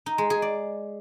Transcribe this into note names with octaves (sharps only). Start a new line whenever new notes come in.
D#4
G#3
G#4
D5